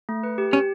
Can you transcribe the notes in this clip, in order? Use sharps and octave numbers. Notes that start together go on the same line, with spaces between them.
A3
B4
G4
C#4 G4